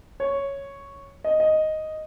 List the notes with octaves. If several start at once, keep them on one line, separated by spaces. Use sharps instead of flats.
C#5
D#5
D#5